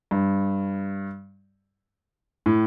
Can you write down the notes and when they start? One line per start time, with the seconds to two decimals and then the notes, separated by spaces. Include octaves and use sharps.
0.11 G2
2.46 A2